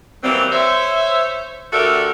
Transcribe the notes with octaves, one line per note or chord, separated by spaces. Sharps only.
E3 F#3 G3 A#3 C4
C5 C#5 E5
D3 A3 F#4 G4 A4 A#4